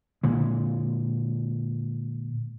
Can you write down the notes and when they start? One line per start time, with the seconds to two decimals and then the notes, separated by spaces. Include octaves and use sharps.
0.23 A#2 D3 G#3